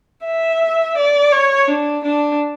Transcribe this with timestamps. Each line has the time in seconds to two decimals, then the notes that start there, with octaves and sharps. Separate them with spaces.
0.25 E5
0.97 D5
1.32 C#5
1.68 D4
2.04 D4